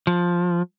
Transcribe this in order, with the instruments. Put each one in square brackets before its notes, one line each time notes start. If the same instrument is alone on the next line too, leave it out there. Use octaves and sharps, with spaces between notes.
[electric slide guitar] F3